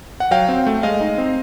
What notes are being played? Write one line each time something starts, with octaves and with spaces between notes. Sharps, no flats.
F#5
F#3 F5 G5
C4
A3
G#3 D#5 F5
D#4
C4